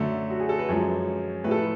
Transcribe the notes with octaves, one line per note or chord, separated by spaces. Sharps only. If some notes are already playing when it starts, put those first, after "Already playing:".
Already playing: F#2 D3 F#3 A3
F#4
G#4
A4
B4
F#2 F3 G#3 C#5
A2 F3 A3 B4
A4
B4